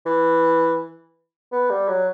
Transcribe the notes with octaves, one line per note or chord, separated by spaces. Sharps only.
E3
B3
G3
F#3